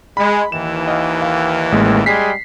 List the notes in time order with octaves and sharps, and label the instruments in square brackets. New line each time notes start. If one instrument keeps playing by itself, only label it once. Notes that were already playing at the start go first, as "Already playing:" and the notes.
[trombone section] G#3 [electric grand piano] B5
[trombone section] D#2 D#3 E3 [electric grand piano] E7
[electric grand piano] D#5 F5
F5
A1 G#3 A#3
[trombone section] G3 G#3 G#4 [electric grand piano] B6 C7